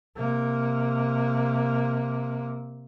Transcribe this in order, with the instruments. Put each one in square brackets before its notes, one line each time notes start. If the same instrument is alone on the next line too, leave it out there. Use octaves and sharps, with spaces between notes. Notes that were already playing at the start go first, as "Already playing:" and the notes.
[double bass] C3 A#3